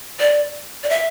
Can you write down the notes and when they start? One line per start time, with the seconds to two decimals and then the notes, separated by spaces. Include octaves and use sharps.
0.20 D5
0.83 D5
0.90 E5